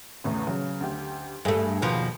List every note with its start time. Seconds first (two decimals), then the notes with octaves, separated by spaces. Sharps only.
0.24 E2 A2 C#3
0.47 C#3 F#3
0.80 D2 G4
1.45 G2 G3 A3 G#4
1.82 D#2 B2 F3